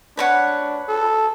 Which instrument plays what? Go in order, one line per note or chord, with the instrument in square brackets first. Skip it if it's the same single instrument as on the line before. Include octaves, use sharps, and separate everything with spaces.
[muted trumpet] D4 [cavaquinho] B4 C#5 F#5
[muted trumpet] A4